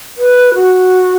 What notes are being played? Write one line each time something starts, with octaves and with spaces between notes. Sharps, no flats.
B4
F#4